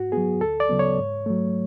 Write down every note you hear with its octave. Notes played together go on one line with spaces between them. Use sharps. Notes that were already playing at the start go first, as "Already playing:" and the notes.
Already playing: G#2 F#4
F#3 B3 G#4
D2 A4
D5
C#3 F#3 B3
C#5
G#2
F#3 A3